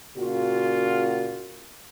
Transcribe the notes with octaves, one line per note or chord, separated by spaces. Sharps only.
A#2 C#3 F4 F#4